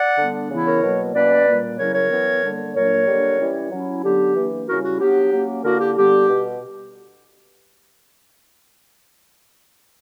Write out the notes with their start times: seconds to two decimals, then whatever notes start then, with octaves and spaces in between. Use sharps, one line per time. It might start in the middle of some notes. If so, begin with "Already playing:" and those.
Already playing: D5 F#5
0.18 D3 G3 B3 D4
0.51 C#3 E3 B3 E4
0.66 A#4 C#5
0.83 B2 F#3 A#3
1.14 B2 A#3 C#4 B4 D5
1.47 A#2 G3 A#3
1.79 C#3 F#3 C#4 E4 A#4 C#5
1.94 A#4 C#5
2.10 E3 B3 E4
2.43 D3 G3 A#3
2.74 A#2 F#3 A#3 D4 A#4 C#5
3.07 D3 G3 A#3 D4
3.39 E3 G3 C#4 E4
3.71 F#3 C#4 E4
4.03 D3 F#3 B3 D4 G4
4.35 E3 A#3 D4
4.67 C#3 G3 C#4 E4 F#4 A#4
4.84 F#4
5.00 F#3 B3 D4 G4
5.32 F#3 A#3 C#4
5.64 D3 A#3 E4 F#4 A#4
5.80 G4
5.96 D3 G3 B3 D4 G4
6.29 B2